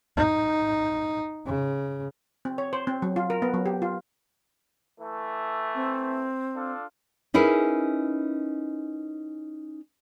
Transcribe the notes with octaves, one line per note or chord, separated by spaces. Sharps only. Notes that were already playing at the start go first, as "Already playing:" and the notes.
D#4
C#3
C4
C#5
C5
C4
F#3
F4
A#4
B3
F#3
G4
F4
E3 A3
C4
D4 F4 A4
C#4 D#4 E4 G#4 A#4 B4